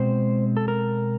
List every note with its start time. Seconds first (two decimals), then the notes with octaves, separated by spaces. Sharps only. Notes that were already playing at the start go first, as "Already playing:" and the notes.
Already playing: B2 G#3 C4 C5
0.57 A4
0.68 A#4